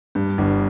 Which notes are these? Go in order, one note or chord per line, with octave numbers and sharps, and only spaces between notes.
G2
G1